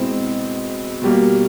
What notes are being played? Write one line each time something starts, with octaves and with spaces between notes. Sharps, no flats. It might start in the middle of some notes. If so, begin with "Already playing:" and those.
Already playing: B2 G#3 C4 E4
B2 G3 A#3